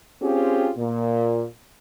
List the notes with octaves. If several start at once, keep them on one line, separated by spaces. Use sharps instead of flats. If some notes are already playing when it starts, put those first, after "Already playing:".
C4 C#4 F4 G4 G#4
A#2